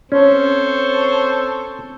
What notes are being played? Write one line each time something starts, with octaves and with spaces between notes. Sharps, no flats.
C4 C#4 A4 C5 C#5